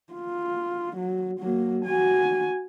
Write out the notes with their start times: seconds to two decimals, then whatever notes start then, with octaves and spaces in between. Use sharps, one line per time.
0.13 F4
0.96 F#3
1.40 F#3 A#3
1.85 F#4 G#5